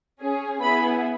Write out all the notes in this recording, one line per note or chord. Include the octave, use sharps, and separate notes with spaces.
C#4 G#4
B3 E4 G#4 B5